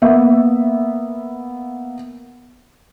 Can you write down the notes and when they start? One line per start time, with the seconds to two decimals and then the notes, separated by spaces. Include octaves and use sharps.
0.02 A#3 B3 E5